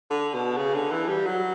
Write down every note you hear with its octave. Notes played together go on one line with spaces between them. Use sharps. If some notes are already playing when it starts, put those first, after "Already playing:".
D3
B2
C#3
D3
E3
G3
F#3